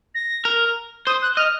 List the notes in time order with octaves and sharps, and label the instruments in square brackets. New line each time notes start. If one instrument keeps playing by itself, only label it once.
[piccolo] A#6
[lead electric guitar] A#4
[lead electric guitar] C5 [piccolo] D#6
[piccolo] F#6
[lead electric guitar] D#5 [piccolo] F6